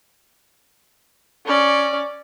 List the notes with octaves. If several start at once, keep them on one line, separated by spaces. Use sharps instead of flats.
C#4 D5